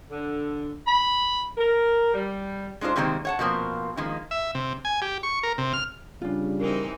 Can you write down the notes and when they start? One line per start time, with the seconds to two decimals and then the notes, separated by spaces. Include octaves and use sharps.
0.11 D3
0.87 B5
1.58 A#4
2.14 G3
2.81 G#3 D4 D#4 F4 C5
2.96 C3 D#3 G3 G#3 A#3 C4
3.25 C#5 F#5 A5
3.39 B2 F3 A#3 C4
3.97 D#3 F3 G#3 A#3
4.31 E5
4.55 C3
4.85 G#5
5.02 G4
5.23 C#6
5.43 A#4
5.58 C3
5.73 F6
6.22 C#3 G3 D4 F4
6.60 E3 C4 D#4 A#4